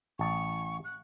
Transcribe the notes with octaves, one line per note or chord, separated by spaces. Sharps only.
A1 A5 C#6
F#6